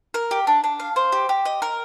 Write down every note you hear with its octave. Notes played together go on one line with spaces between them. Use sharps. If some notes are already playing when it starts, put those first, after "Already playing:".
A#4
G4
D4
D4
F5
C5
G4
G4
D#5
A#4